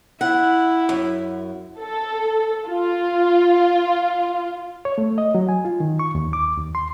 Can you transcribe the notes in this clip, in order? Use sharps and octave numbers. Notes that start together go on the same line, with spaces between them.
E4 F#5
F#2
A4
F4
C#5
A3
D#5
F#3
G#5
F4
D#3
C#6
D#2
D6
D#2
C6